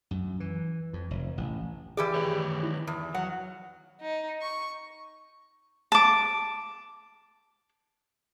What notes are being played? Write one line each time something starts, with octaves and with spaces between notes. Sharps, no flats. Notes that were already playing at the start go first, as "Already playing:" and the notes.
F#2
E3
F2
F1
A1
E3 G4 G#4 D5 B5 F6
D#3 B4 C#5
D#4 E4
E2
F#3 F#5
D#4
C#6
A5 D6